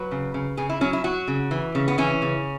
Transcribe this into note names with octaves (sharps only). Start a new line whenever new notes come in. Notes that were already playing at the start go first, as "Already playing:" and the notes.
Already playing: F#3 B4
C#3
C#3
C#3 G#4
E4
F#3 C#4
E4
F#3 F#4
C#3
E3
C#3
B3
E3 C#4
C#3